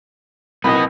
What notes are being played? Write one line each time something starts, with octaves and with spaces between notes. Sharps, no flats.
B1 B3 C4 E4 A#4 D#5 B5